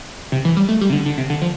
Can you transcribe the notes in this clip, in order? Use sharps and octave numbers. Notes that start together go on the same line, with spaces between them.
C3
E3
G3
A3
G3
C3
D3
D3
C3
D3
F3